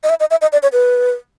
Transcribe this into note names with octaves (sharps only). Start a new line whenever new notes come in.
D#5
E5
D#5
E5
D#5
D5
C#5
B4